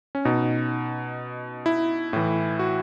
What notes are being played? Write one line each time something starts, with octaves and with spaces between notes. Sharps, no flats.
C#4
B2 D#4
E4
A2 E3
F#4